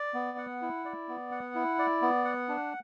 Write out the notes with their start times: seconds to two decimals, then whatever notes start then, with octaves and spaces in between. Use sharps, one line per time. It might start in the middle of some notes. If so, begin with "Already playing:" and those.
Already playing: D5
0.14 B3
0.38 F#5
0.62 E4
0.85 D5
1.09 B3
1.31 F#5
1.55 E4
1.79 D5
2.02 B3
2.25 F#5
2.49 D4